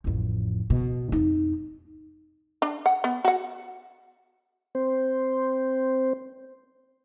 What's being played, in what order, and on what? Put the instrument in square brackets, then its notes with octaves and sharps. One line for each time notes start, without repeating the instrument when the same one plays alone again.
[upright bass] A1 F2
B2
F2 D#4
[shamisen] D4
F#5
B3
F#4 F#5
[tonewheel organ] C4 C5